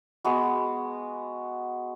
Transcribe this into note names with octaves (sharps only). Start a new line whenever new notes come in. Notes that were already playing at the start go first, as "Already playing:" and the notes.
G#3 B3 F#4